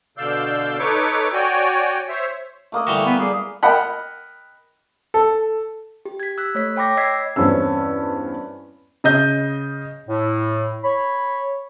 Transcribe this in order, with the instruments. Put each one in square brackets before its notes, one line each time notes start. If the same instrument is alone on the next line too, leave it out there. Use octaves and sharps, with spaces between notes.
[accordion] B2 D3 D5 F5 E6 G6
D#4 A4 B4 C#5 C#6 D6
F#4 C#5 D5 G5 G#5
C5 C#5 E5
[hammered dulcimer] A3 A#3 D#5
[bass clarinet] D3 [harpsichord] E3 G3 F#4
[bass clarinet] B3
[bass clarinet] G3 [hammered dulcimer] G#4 A#4 D5
[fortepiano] A#4 D#5 F#5 G5 A5 B5
[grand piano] A4
[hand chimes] G4
G#6 B6
E6 F#6 B6
A3 C#5 B6
C#5 G5 B5 D6 A#6
D#5 E6 G#6 B6 C7
[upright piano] E2 G2 C4 C#4 E6
[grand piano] C#3 D#5 G6
[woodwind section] A2
C#5 B5